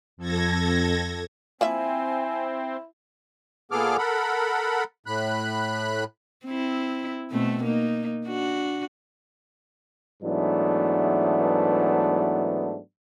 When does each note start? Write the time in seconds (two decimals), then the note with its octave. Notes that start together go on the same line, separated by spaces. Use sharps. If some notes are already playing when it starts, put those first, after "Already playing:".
0.17 F2 A4 G#6 A#6
1.61 F3 A#3 C4 E4 E5 G#5
3.72 A#2 B3 G#4 A4 D6 F6
3.98 A4 A#4 F#5 B5
5.06 A2 B5 F#6
6.46 C4 E4
7.31 B2 A3 C4
7.64 A#3 D#4
8.27 D4 F#4
10.23 G#2 E3 F#3 A3 B3 D4